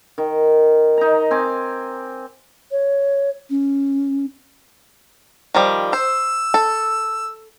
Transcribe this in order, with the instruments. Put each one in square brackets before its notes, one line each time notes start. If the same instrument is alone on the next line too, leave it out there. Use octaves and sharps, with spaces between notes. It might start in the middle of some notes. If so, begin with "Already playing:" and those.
[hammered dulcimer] D#3
D#4 A#5
C4 G#5 D6
[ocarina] C#5
C#4
[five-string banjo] D#3 F3 G3
[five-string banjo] C5 [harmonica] E6
[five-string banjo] A4